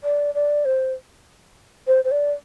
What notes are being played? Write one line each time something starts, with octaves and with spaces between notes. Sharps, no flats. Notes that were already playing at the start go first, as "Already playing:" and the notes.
D5
D5
C5
C5
C5
D5